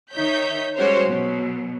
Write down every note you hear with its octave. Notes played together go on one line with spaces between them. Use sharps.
D#3 D#4 C#5 E5 G6 B6
G3 G#3 C#4 F#4 C5 C#5
B2 F#3